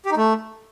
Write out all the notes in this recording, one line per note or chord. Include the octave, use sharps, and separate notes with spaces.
G4
D#4
A3